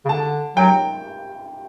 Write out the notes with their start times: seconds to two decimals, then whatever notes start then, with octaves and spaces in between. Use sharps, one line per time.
0.05 C#3
0.09 D3 A5
0.57 F#3 G5